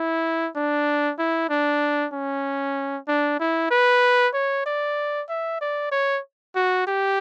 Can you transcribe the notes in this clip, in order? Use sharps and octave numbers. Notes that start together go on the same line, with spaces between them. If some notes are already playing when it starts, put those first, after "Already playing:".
Already playing: E4
D4
E4
D4
C#4
D4
E4
B4
C#5
D5
E5
D5
C#5
F#4
G4